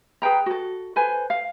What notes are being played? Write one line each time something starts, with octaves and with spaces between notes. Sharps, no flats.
G#4 B4 G5 A#5
F#4 A4
A4 B4 C5 G#5
F5